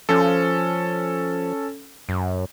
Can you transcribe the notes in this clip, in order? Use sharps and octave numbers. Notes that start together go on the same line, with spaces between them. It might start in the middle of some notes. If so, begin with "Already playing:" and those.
F3 C#4 A4
F#2